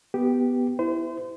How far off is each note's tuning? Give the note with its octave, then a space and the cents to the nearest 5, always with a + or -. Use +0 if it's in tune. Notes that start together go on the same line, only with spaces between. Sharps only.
B3 +0 G4 +0
E4 +0 C5 -35